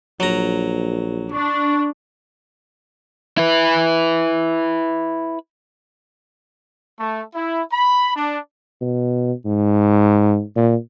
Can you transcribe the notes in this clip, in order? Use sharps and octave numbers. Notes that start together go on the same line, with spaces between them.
A#1 F#3 A#5
D4 C#6
E4 B4
A3
E4
B5
D4
B2
G#2
A#2